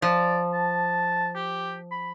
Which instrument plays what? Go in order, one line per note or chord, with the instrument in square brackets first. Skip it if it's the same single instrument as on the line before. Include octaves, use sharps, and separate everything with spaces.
[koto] F3 [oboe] D5
[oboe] A5
G4
B5